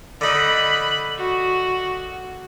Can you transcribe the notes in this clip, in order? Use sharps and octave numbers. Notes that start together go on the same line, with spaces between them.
D3 D#4 B5 F#6
F#4